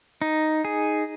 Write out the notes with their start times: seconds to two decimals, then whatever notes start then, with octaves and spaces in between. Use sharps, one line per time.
0.22 D#4
0.65 G#4